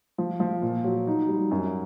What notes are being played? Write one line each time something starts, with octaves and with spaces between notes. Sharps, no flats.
F3
F3
A#2
F#3
D#4
G3
F#2